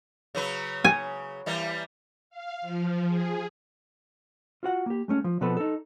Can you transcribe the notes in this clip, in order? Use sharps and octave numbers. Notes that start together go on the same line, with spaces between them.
C#3 F#3 B4
G#5
E3 G3 A#3
F5
F3
G#4
F4 F#4 F#5
A#3 G4
G#3 A3 C#4
F3
B2 F3 B3 C4 A4 B4
D#4 A4